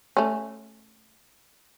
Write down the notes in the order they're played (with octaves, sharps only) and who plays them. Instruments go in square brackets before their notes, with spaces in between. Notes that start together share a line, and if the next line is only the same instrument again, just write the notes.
[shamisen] A3 C#4